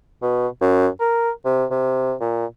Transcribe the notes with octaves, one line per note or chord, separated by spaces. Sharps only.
B2
F#2
A#4
C3
C3
A#2